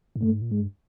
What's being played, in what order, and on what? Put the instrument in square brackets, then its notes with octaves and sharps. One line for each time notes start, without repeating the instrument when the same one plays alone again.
[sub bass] G#2
[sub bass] G2 [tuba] A3
[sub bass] G#2
A#2
[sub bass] G#2 [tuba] G#3
[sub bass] G2